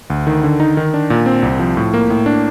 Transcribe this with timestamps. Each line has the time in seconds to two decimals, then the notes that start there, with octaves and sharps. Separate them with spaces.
0.10 D2
0.27 D#3
0.44 D3
0.60 D#4
0.77 D#3
0.94 D4
1.10 A#2
1.26 C4
1.43 C2
1.60 F3
1.77 A2
1.94 A#3
2.10 A2
2.26 D4